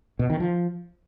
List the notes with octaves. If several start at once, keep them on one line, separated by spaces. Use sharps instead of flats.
B2
D#3
F3